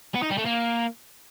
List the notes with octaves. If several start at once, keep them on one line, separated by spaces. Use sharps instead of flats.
B3
D#4
G3
A3
A#3